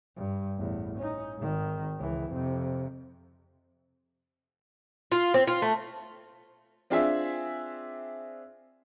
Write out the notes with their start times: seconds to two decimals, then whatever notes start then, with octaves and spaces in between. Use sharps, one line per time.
0.16 G2
0.58 A1 E2
0.98 C#4 D#4
1.38 G#1 D#3
1.99 C#2 E3
2.32 F2 C3
5.12 F4
5.34 C4
5.47 F4
5.62 A3
6.90 C4 D4 F4 G#4 E5